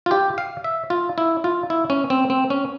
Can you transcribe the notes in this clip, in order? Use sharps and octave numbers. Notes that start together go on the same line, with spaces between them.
F4
G4
F5
E5
F4
E4
F4
E4
C#4
C4
C4
C#4